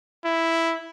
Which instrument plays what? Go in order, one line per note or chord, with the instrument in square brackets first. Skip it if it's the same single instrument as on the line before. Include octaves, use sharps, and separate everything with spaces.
[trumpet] E4